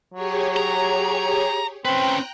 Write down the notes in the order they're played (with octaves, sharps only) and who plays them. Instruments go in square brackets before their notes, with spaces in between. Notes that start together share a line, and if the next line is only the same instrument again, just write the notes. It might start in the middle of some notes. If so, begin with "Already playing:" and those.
[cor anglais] F#3 [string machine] G4 G#4 C#5
[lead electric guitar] A#5
[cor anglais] C4 [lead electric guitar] C#4 B4 [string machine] G5 A#5 F#6